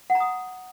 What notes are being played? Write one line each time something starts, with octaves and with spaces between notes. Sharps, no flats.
F#5
A#5
D#6